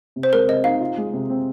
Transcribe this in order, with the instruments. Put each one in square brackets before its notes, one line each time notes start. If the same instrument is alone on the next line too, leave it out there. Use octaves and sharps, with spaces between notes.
[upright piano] C3
[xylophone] C5
[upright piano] G#3 [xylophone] A#4
[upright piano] C3 [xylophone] D#5
[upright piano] D#4 [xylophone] F5
[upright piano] F4
G#3
C3
C4